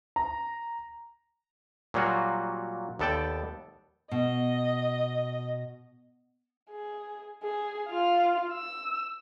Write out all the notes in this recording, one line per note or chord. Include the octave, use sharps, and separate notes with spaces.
A#5
A#2 F#3 G3 A#3 F4 F#4
D#2 B3 A4 D5 G5 A5
B2 D#5
G#4
G#4
F4 F5
E6